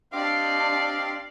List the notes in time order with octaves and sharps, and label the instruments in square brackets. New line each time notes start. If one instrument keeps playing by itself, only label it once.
[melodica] C4 D#5 D6 [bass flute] D4 [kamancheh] G4 D5 [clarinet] F5